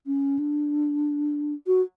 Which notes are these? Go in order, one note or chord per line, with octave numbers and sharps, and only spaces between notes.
C#4
D4
F#4